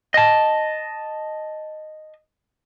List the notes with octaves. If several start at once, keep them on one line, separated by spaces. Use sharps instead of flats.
D#5 A5